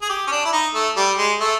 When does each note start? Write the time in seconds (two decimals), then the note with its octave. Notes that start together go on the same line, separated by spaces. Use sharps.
0.02 G#4
0.09 G4
0.27 C#4
0.32 D4
0.45 E4
0.53 D#4
0.75 A3
0.97 G3
1.18 G#3
1.40 A3